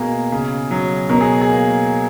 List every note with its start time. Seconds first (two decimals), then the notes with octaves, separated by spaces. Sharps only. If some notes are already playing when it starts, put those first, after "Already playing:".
Already playing: B2 A#3 G#4
0.32 C#3
0.71 F#3
1.09 B2 A#4
1.21 G#4
1.41 G#4
1.49 A#3